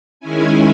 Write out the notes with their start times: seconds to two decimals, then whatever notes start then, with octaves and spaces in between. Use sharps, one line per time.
0.20 D#3 G#3 C#4 E4 G#5